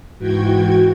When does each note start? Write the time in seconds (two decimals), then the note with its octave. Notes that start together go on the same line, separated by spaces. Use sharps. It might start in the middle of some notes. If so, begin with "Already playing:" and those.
0.17 G#2 E3 F#4 G5 G#6